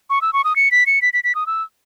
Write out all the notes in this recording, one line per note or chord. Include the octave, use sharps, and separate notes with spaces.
C#6
E6
C#6
D#6
C#7
B6
C#7
B6
B6
B6
D#6
E6